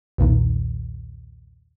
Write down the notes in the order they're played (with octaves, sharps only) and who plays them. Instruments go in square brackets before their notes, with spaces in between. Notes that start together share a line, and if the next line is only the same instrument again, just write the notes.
[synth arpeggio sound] B1 E2 A#2 D#3